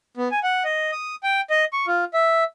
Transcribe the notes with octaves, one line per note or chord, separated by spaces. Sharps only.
B3
G#5
F#5
D#5
D#6
G5
D#5
C#6
F4
E5